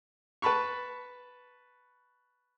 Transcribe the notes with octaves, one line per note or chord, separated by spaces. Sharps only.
B4 A5 B5 C#6